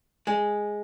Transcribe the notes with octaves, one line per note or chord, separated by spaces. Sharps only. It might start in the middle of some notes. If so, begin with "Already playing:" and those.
G#3